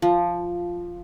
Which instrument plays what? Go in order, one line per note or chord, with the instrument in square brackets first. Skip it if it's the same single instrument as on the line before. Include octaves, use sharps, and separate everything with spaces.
[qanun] F3